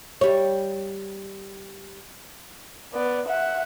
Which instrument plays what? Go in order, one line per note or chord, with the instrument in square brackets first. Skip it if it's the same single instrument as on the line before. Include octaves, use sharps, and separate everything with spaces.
[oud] G3 C#5
[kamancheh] B3 D5
E5 F#5